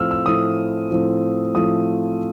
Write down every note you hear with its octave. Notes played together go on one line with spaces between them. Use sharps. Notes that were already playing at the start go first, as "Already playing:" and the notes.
Already playing: A2 F3 A3 C4 E6 F6
E6
A2 F3 A3 C4 D#6
A2 F3 A3 C4
A2 F3 A3 C4 D#6